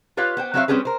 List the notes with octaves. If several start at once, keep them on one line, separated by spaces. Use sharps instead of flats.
F4 G4 B4 C#5 F5
B3 C5 G5
F#3 C4 F#4 C#5 E5 F5
G3 C4 C#4 G4 G#4 B4
A#4 C5